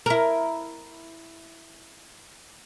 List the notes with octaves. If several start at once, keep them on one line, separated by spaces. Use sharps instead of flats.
E4 A#4